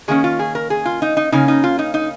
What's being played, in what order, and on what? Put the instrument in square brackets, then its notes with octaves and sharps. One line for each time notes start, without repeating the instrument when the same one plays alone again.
[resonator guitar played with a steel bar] D#3 A#3 C#4 G#4
F4
G#4
A#4
G#4
F4
D#4
D#4
C#3 A#3 C#4 D#4
D#4
F4
D#4
D#4